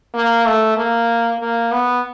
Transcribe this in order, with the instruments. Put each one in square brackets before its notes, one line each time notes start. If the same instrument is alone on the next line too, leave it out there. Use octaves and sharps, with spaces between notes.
[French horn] A#3
A3
A#3
A#3
B3